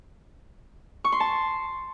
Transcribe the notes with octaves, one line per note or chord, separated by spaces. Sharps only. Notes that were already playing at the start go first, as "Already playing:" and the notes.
C#6
C6
A5